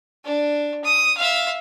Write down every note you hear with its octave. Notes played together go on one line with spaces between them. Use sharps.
D4
D#6
E5 F5